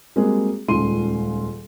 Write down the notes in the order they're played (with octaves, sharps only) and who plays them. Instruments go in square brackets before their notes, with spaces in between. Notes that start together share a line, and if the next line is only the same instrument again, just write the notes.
[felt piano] G3 G#3 A#3 C4 F#4 G#4
D#1 C#2 F4 C6 D#7